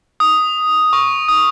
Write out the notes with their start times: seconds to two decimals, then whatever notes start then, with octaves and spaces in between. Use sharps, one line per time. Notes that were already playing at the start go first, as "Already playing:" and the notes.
0.20 D#6
0.93 C#6
1.28 D#6